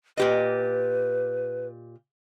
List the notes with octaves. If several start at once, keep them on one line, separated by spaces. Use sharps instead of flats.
A#2 G4 B4 D#5